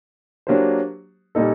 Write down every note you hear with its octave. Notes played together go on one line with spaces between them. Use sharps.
F#3 A#3 D4 G4 C5
A#2 G3 A#3 D#4 A4